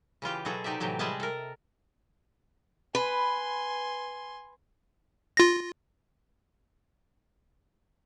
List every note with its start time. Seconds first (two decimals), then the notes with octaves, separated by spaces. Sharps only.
0.22 C#3 E3 F4 G4
0.45 B2 F#3 F#4 G#4 A4
0.64 C3 D#4 G4 D5 E5
0.80 A2 C3 E3 F#3 G4
0.99 G3 G#3 G#4 D#5 E5 A5
1.20 A4 A#4
2.95 B4 G#5 C6
5.37 F4 A#6